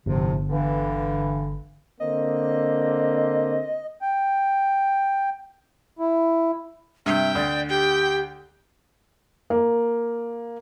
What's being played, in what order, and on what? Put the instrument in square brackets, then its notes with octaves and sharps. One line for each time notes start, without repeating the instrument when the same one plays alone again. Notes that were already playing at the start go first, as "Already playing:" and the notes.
[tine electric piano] G1 [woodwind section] A2 C3 F3
[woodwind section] G2 D3 E3
[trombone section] D3 A#3 C4 [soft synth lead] D#5
[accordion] G5
E4
[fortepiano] G2 C3 [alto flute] E5 [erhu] G5
[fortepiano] D2 [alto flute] D5
[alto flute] G4 [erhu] G5
[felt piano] A#3